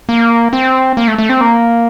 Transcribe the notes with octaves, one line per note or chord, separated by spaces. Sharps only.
A#3
C4
A#3
A3
A3
C4
A#3